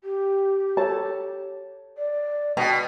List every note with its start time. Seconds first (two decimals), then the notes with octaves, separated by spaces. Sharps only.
0.04 G4
0.77 A4 C#5 A5
1.97 D5
2.57 B2 G5 A5